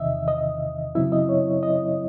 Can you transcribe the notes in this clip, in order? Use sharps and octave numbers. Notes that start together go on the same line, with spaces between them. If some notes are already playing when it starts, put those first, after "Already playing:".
Already playing: E2 C3 D#3 D#5 E5
D#5
F#2 C#3 F#3 C4 E4 E5
D#5
C#5
D#5